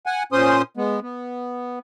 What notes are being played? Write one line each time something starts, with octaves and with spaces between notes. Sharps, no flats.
F#5 G#5
A#2 C#4 C5 C6 D#6
G#3 B3
B3